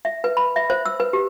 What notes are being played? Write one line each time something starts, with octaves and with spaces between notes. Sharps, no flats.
E5
B4
B5
E5
C5
E6
B4
G4